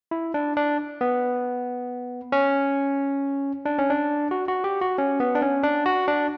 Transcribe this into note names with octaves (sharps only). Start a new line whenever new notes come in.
E4
D4
D4
B3
C#4
D4
C#4
D4
F#4
F#4
G4
F#4
C#4
B3
D4
C#4
D4
F#4
D4